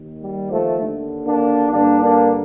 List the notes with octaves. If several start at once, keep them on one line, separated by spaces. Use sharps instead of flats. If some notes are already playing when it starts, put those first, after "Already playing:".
Already playing: D#2 D#3
G3
F3 A3
D#2 D3
A#3 D4
G2 D3 A#3 D4
A#3 D4